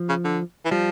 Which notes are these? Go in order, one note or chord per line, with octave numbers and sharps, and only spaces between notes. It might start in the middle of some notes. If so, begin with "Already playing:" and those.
Already playing: F3
C#3
D3
E3
F3 G3